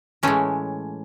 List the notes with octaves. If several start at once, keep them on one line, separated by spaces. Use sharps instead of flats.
A2 E3 G#3 A3 C#4